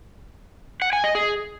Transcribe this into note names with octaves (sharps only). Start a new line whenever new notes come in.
F#5
G#5
D#5
G#4